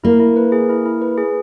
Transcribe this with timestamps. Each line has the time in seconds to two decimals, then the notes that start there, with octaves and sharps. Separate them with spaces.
0.04 A#3 E4
0.20 E4
0.36 B4
0.52 G#4
0.69 E4
0.86 E4
1.01 B4
1.18 G#4